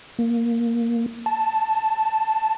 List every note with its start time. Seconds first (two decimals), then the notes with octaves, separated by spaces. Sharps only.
0.19 A#3
1.26 A5